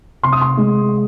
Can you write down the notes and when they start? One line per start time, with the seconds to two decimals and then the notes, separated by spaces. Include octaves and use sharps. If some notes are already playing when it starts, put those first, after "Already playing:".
0.23 C3 C6
0.32 D#6
0.41 C6
0.57 G#3